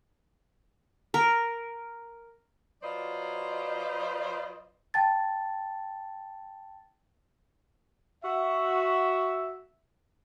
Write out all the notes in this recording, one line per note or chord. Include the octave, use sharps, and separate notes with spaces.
A#4
F#3 F4 B4 C5 D5 D#5
G5 A5 A6
F#4 E5